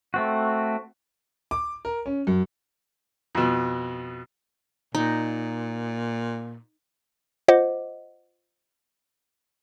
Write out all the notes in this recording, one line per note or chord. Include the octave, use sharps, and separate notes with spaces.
A3 C4 F#4
D6
A#4
C#4
F#2
F2 B2
A#2 D#4
F4 C5 D#5 F#5 D6